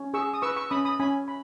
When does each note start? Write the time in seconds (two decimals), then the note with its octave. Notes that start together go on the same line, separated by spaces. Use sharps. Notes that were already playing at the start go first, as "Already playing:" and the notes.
Already playing: C#4
0.14 G#4 C#6 E6
0.33 D#6
0.42 B4 C#6 E6
0.56 C#6 E6
0.70 C#4 B5 D#6
0.85 B5 D#6
1.00 C#4 G#5 B5
1.28 B5